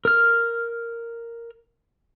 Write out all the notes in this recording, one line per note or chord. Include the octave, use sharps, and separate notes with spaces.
A#4 F6